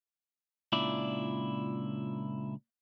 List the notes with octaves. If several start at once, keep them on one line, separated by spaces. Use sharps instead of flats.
C#2 A#2 D4 E4 D5